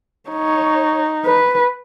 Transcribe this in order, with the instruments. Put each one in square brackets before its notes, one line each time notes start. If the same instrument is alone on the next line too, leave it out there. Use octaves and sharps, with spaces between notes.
[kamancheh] D#4 [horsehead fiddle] C#5
[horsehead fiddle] B4